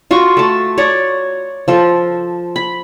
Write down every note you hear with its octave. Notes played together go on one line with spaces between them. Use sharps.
F4 F#4 A#5 C#6
A3 A5
C#5 D5 A#5
F3 A4
B5